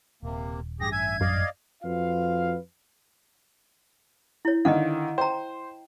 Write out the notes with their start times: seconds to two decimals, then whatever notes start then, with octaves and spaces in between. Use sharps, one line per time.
0.23 D#1 C3 A#3
0.80 A1 G2 G4 G#4 A#6
0.92 E5 G#5 G#6
1.21 F#2 D5 D#5 F5
1.83 F2 F4 F#4 B4 F5
4.45 E4 C#5
4.65 D3 D#3 D#5 F5
5.18 C5 G5 A#5